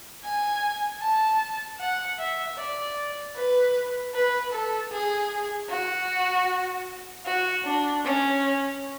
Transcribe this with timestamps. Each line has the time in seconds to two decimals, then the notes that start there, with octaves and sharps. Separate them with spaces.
0.24 G#5
1.02 A5
1.79 F#5
2.20 E5
2.58 D5
3.36 B4
4.14 B4
4.52 A4
4.92 G#4
5.69 F#4
7.25 F#4
7.65 D4
8.04 C#4